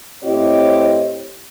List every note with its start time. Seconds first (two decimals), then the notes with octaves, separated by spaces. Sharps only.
0.24 A2 C4 E4 G4 C#5 D#5